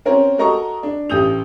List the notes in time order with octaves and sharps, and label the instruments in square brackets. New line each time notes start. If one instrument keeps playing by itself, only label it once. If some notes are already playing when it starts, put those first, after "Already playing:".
[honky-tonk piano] C4 C#4 A#4 C5 C#5
F#4 A4 A#4 D#5 A#5 C#6
D4
A1 G4 D#6 G6 F7